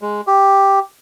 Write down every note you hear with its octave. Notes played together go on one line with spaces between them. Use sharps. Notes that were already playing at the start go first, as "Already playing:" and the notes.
G#3
G4